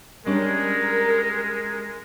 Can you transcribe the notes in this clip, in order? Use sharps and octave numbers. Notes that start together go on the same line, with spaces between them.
G3 G#3 C#4 D4 A#4